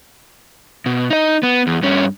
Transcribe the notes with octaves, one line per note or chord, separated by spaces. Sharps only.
B2
D#4 D#5
B3
E2
G2 C#4